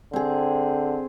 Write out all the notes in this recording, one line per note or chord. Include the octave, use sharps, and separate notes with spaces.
D3 C4 G#4